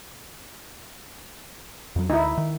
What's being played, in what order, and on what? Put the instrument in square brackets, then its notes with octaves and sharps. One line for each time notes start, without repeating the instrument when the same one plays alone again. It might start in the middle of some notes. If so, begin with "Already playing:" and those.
[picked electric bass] F2 F#3
[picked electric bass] D2 [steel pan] D#4 E4
[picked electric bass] D#3